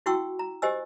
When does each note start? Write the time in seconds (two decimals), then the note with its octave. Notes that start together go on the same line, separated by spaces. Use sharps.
0.06 E4 F#4 F#5 G5 C#6 E6
0.39 A#5
0.62 G4 C5 D#5 G#5 E6